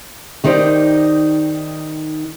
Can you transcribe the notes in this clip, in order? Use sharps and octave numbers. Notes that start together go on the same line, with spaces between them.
D#3 D#4 G4 C5 D5